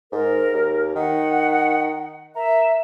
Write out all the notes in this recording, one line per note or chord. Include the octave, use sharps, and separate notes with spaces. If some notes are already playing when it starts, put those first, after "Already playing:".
G#2 A#4
D#2
D#3 F#5
A#4 E5